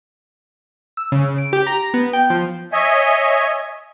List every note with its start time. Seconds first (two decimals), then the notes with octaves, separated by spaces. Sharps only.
0.97 E6
1.12 C#3
1.38 D7
1.53 G4
1.67 A#5
1.94 B3
2.13 G5
2.30 F3
2.72 C#5 D#5 E5 G#5